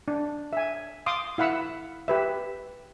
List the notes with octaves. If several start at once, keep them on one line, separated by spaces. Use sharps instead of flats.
D4
E5 G#5
F5 C6 D6 D#6
E4 F5 F#5 B5 E6
G4 B4 E5